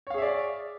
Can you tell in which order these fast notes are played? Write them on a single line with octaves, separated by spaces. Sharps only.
C#5 F5 G#4 E5 D5